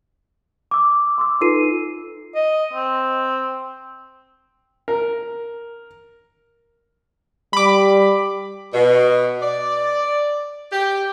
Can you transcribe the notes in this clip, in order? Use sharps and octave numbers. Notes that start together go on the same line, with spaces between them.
D6 E6
C6 D6 E6
D#4 F4 A4 B4 C7 D#7
D#5
C4
A#4
G3 B5 D6
B2
D5
G4